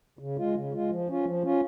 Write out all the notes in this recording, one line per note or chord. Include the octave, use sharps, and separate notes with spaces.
C#3
G#3 F4
C#3
G#3 F4
F3
C#4 F4
F3
C#4 F4